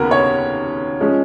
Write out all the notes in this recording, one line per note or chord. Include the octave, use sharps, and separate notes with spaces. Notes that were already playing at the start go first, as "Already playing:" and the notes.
Already playing: F1 D#2 C#3 B3 F#4 A#4
C#5
F3 G#3 C#4